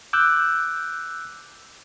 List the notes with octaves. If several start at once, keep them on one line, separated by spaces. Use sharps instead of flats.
D6 E6 F#6 G6